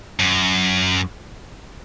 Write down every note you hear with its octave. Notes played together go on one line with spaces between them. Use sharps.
F#2